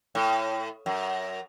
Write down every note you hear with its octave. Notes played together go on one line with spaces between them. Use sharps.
A2
F#2